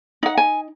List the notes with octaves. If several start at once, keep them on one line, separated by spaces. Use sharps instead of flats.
D#4 F#5
G#5